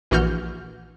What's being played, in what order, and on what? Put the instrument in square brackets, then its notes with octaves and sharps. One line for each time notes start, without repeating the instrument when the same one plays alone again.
[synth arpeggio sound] A#1 E3 F#4 F6 G6